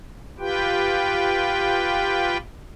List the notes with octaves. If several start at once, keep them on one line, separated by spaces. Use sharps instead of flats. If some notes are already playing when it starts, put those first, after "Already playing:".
F4 G4 B4 G5